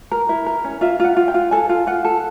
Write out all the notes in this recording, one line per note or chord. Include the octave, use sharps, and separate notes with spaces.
A#4
E4
A#4
C#4
F4 E5
F4 F#5
F4
G5
F4
A4 G#5
F4
F4 F#5
A4